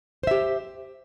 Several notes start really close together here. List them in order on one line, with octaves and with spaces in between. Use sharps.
C5 E5 G4